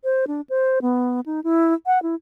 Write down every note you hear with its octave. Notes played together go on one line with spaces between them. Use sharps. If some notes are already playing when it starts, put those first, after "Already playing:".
C5
D4
C5
B3
D#4
E4
F#5
E4